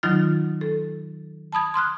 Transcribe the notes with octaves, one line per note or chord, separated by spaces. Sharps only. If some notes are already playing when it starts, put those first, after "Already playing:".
D#3 F#3 D#4 F4 F6
A4
A5 B5 D#6 G#6
C6 D#6 F6 F#6